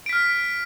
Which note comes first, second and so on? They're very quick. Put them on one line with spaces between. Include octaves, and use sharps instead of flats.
D7 B6 F6